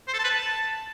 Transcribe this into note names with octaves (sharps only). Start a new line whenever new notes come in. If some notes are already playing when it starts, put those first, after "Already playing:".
C5
A4
A5
B4
A5